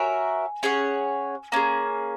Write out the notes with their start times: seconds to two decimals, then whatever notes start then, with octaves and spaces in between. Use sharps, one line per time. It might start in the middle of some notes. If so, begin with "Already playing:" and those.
Already playing: F#4 A#4 C#5 E5 G#5
0.63 C#4 G#4 C#5 F#5
1.52 A#3 C#4 G#4 A#5